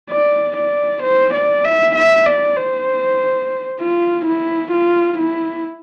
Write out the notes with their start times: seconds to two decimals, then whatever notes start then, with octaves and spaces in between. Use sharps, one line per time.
0.10 D5
0.57 D5
1.03 C5
1.34 D5
1.65 E5
1.95 E5
2.26 D5
2.57 C5
3.80 F4
4.25 E4
4.72 F4
5.18 E4